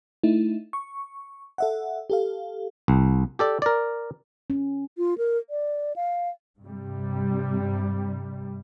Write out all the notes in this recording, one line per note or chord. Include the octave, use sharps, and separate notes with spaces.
A3 D#4 E4
C#6
A4 E5 F#5
G4 A4 F5
C2
G4 A4 D5
A#4 D5
C#4
F4
A#4
D5
F5
G2 C3 G3